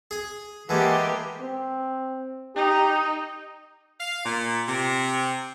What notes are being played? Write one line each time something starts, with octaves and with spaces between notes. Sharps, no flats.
G#4 G#5
E3 G#3 A#3 G4 B4 F#5 G#5 A5
C4
D#4 G4
F5
A#2
C3